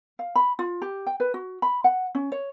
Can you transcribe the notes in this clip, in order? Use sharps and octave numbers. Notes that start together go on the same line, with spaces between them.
F5
B5
F4
G4
G5
B4
F#4
B5
F#5
C#4
C#5